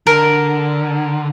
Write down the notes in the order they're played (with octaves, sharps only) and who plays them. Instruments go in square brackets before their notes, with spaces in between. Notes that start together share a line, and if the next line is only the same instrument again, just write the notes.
[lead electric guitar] D3 [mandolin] A#4